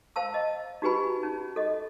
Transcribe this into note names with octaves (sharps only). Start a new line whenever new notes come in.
C5 F5 A5 E6
D#5
D#4 F#4 G4 B4 G#5 B5
C#4 D#4
A4 D#5